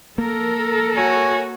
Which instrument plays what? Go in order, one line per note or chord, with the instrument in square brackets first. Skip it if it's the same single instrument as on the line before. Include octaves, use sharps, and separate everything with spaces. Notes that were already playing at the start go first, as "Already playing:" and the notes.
[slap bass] A#3 [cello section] A4 A#4
[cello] F#4 [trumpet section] C#5 G#5